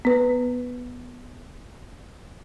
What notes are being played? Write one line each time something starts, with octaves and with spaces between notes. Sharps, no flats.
B3 B4